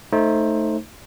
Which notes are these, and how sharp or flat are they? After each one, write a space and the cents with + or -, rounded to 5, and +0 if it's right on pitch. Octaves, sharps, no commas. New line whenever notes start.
A3 +0 D#4 +0 C5 +15